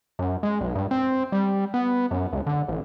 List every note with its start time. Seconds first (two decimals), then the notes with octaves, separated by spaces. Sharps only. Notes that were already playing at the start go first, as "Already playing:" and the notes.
0.19 F#2
0.43 G#3
0.61 B1
0.75 G2
0.91 C4
1.32 G3
1.74 B3
2.11 F#2
2.33 C#2
2.47 D3
2.68 A1